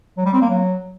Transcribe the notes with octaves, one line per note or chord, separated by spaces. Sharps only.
F#3
G3
C4
A#3
F#3